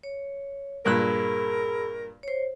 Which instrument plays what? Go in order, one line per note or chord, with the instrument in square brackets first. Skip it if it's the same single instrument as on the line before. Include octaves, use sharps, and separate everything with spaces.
[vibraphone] C#5
[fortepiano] G2 A#2 F#6 [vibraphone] G#4 B5 E6 [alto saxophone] A#4
[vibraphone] C5 C#5